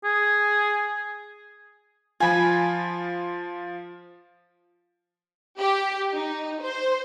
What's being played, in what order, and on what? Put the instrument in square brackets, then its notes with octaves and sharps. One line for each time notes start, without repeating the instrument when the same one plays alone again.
[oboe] G#4
[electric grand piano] F3 F4 [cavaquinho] G#5 B5
[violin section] G4
D#4
C5